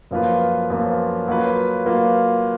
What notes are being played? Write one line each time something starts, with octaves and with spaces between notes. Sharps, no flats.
F#2 F3 A#3 F4 B4
F#2 F3 A#3 F4 B4
F#3 A#3 F4 B4
F#3 A#3 F4 B4